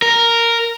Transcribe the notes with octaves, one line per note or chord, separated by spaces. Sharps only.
A#4